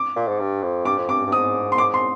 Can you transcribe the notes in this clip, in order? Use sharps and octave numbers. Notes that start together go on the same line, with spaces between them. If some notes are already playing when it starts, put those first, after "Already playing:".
Already playing: D6
A#2
G#2
G2
F2
G2 D6
F2
G2 D6
G2
G#2 D#6
C6
D6
C6